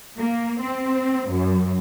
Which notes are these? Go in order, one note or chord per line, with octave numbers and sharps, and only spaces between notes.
A#3
C4
F#2